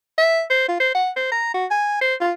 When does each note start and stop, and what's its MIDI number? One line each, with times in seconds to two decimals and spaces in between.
0.18 0.43 76
0.50 0.67 72
0.68 0.79 65
0.80 0.90 72
0.95 1.10 78
1.16 1.27 72
1.32 1.52 82
1.54 1.66 66
1.71 1.98 80
2.01 2.15 72
2.20 2.32 65